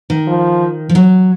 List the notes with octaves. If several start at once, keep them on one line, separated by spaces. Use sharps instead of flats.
D#3
F3
F3
F#3